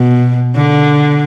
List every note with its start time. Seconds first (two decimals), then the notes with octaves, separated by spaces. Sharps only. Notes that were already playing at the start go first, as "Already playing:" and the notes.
Already playing: B2
0.56 D3